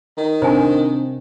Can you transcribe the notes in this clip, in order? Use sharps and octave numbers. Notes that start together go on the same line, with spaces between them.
D#3
C3 D4 C5 G#5